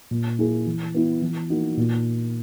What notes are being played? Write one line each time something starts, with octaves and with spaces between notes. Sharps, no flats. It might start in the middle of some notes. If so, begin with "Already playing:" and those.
A#2
A#3 E4 G#4
E3
B3 E4
E3
A#3 D#4 F#4
A#2